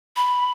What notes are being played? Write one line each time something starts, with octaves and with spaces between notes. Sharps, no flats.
B5